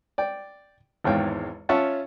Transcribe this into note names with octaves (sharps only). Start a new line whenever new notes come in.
D5 G5
G#1 E2 G#2 C#5 F5 G5
C#4 F4 C#5 E5 F#5 A5